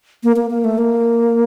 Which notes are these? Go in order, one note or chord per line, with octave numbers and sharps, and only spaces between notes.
A#3
A#3
A#3
A3
A#3